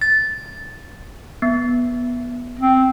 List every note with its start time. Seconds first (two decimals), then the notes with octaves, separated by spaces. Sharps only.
0.01 A6
1.42 B3
2.59 C4